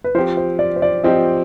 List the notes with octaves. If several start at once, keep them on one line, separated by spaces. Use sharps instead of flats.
B4
F3 C4 G4 C5
C5
D5
C5
D5
F3 C4 G4 D#5